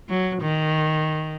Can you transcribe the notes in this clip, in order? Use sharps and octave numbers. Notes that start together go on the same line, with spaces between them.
F#3
D#3